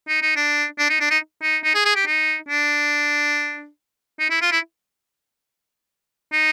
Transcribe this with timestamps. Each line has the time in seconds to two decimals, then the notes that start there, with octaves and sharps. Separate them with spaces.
0.08 D#4
0.22 D#4
0.36 D4
0.79 D4
0.90 D#4
1.00 D4
1.10 D#4
1.42 D#4
1.64 D#4
1.75 G#4
1.85 G#4
1.96 G4
2.07 D#4
2.49 D4
4.20 D#4
4.30 E4
4.42 F4
4.51 E4
6.33 D#4